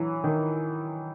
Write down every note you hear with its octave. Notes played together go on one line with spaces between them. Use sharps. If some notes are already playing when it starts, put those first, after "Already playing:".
Already playing: E3 F#3
D#3